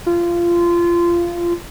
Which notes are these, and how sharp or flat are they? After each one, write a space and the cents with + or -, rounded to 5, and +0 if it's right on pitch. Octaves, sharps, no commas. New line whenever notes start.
F4 -20